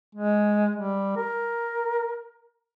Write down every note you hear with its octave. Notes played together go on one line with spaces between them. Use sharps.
G#3
G3
A#4